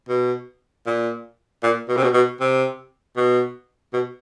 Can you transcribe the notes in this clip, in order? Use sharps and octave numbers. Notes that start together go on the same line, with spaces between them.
B2
A#2
A#2
B2
C3
B2
B2
C3
B2
B2